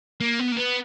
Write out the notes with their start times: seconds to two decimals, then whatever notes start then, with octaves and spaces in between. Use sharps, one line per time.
0.20 A#3
0.39 B3
0.52 A#3
0.57 B3